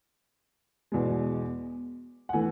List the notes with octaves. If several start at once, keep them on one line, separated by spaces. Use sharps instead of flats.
E2 B2 G#3
F#5
E3 A3 G#5